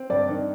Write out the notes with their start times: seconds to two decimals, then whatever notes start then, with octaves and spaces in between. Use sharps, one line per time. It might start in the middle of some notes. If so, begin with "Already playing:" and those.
Already playing: C4
0.10 G2 D5
0.29 D#3